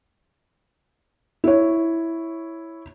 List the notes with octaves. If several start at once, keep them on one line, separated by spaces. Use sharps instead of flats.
E4 C#5